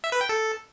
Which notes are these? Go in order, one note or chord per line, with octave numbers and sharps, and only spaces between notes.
E5
B4
G5
A4